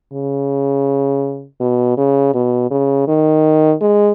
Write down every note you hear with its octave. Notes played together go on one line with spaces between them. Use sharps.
C#3
B2
C#3
B2
C#3
D#3
G#3